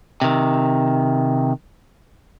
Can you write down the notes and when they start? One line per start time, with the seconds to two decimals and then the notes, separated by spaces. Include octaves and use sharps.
0.21 C3 D#3